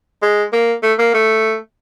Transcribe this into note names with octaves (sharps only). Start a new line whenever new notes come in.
G#3
A#3
A3
A#3
A3